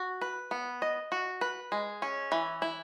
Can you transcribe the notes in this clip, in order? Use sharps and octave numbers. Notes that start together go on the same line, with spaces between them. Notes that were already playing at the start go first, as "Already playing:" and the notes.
Already playing: F#4
B4
B3
D#5
F#4
B4
G#3
C#4
E3
E4